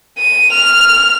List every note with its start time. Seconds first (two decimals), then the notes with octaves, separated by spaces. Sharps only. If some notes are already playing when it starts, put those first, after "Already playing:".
0.18 D#7
0.53 F6 F7